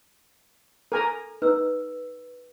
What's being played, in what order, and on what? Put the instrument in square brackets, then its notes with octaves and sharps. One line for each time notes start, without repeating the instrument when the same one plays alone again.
[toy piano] A4 [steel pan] A#4 G#5 A#5
[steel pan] D#4 [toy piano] B4 E6